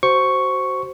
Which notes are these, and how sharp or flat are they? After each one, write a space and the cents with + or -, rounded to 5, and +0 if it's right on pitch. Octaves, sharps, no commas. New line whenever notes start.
F#4 +25 C5 +0 C#6 +0